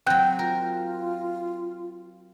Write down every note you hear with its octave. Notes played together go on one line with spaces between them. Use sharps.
F#3 C4 G5 F#6 G6
F4 A#4